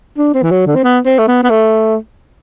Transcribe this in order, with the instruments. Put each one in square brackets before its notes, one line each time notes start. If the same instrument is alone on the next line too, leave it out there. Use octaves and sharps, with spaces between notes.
[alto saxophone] D4
C4
E3
F#3
D3
C4
B3
C4
A3
B3
B3
A3